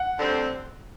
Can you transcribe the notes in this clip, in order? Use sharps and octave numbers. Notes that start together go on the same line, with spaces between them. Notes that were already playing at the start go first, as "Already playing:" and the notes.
Already playing: F#5
D2 D3 G3 C4